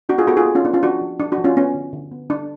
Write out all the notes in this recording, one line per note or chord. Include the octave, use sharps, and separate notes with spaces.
B3 D4 F#4
F4 G#4
B3 F#4 A4
F4 G#4
B3
C#4 F4
B3 D4
C#4 F4
F3 D4 F#4
F3
F3 D4
D4 F#4
F3
C#4 F4
B3 C#4
D3
D3
B3
D3 D4